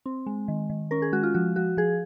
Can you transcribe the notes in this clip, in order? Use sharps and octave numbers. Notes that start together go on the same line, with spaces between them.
C4
G#3
D#3
D#3
C#4 A#4
G#4
G#3 F#4
F4
F3 F#4
F3 F#4
F3 G#4